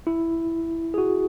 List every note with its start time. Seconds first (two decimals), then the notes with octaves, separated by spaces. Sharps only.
0.07 E4
0.94 G#4
0.98 F#4